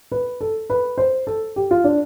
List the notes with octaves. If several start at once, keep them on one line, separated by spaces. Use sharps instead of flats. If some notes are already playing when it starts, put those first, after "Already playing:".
B4
A4
B4
C5
A4
G4
F4
D4